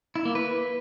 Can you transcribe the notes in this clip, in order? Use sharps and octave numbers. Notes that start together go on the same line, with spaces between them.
E4
A#3
B4